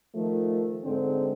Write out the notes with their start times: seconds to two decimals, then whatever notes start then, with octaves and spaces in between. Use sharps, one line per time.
0.14 D#3 F3 A3
0.84 G#2 D3 C4